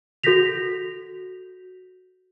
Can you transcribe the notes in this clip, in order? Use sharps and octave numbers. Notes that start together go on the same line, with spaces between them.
F#4 A4 G6 A#6 B6 F7